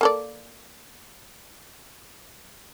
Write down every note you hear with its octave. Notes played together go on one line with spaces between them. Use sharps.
A#3 A4 D5